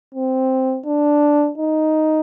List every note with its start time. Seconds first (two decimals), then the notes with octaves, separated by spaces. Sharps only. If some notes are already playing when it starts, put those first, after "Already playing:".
0.14 C4
0.86 D4
1.58 D#4